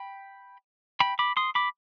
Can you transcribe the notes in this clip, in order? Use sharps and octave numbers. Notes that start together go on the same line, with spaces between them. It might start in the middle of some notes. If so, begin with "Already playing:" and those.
Already playing: G5 B5
G5 B5
B5 D6
C6 D#6
B5 D6